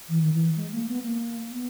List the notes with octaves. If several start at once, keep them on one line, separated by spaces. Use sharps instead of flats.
E3
D#3
E3
G#3
A#3
B3
A#3
B3